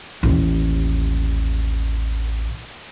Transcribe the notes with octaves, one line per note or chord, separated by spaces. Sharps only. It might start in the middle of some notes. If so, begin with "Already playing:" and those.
A1 D#2